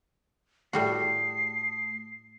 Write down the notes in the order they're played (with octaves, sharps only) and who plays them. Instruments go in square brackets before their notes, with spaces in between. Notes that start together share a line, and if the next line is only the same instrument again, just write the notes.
[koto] A2 G3 F#4 [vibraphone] A3 D#6 [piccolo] C7